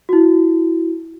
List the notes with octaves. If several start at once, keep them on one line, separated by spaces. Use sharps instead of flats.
E4 F#4